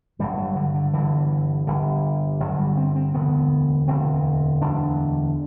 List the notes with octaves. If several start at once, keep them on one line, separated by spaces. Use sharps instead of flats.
G1 G2 D3 G3
F#3
D3
D3
G1 G2 D3 E3
G1 G2 D3
G1 G2 D3 F#3
G3
C4
C4
E1 D2 D3 B3
E1 D2 D3 C4
E1 D2 D3 D4